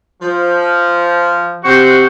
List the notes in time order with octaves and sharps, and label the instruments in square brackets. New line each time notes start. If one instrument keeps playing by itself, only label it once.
[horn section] F3
[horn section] C3 F#5 [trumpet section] F#4 C5 C#6